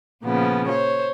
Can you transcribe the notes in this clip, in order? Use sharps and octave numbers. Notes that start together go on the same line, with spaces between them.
A#2 C#3 F3 B3
C5 C#5